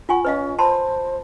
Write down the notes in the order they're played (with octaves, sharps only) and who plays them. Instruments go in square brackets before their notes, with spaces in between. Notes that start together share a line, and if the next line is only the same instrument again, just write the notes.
[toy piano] F4 G#5 C#6 [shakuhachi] F#5
[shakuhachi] C#4 [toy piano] B4 D#5 F5
[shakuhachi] C5 [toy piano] A5 B5 C6